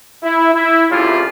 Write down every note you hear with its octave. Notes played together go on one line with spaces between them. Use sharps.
E4
E4
C2 A2 C#3 G3 F4